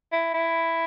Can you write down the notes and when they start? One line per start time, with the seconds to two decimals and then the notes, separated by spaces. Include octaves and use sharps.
0.12 E4
0.34 E4